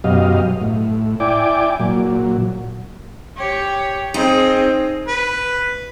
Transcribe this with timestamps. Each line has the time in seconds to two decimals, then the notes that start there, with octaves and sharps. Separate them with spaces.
0.04 F#2 B2 F#3 G4 D#5 F5
0.61 A2
1.20 E4 D5 G5 G#5 D6
1.80 A#2 F#3
3.37 G4 C#5
4.14 C4 D#4 G#4
5.08 B4